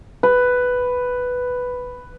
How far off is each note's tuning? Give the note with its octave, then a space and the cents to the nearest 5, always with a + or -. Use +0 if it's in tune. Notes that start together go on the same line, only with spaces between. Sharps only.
B4 +5